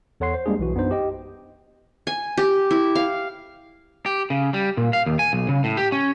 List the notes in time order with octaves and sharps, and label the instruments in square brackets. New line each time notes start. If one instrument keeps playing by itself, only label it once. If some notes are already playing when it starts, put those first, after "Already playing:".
[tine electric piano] E2 A4 C#5 F#5 C6 C7
C5
G3 G#3 A#3 D4 G#4
B1 E3 F#4
F#2 B3 D4 D#4 C5
G4 D#5 G5
[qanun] G#5
G4
E4
F5
[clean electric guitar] G4
C#3
G3
A#2
F5
D#2
G#5
B1
C#3
A2
G4
C#4